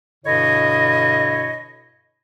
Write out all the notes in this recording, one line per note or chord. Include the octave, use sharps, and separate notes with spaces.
G2 B2 D3 E4 C#5 D#5